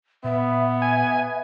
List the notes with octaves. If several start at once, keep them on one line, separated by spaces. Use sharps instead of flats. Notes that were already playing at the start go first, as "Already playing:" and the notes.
A#2 B3 E5
G#5